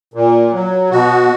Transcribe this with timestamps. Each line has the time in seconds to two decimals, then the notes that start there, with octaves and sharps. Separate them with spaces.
0.14 A#2
0.52 F#3
0.91 B2 F#4